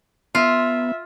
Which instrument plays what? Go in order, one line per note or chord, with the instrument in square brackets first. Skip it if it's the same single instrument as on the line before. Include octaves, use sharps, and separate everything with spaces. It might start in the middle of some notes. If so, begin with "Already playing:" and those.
[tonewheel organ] B3 [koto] F4 [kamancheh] E5